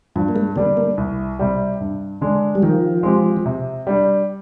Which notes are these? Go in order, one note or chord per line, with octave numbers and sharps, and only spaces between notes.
G2 F3
A#3
G#3
D3 G3 A#3 D4
A#3
C2
C3 G3
G2
D3 G#3 D4
G3
D#3 F3
G#3 C4 G4
C3
G3 D4